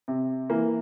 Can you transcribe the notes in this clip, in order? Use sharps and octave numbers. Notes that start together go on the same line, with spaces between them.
C3
E3 A#3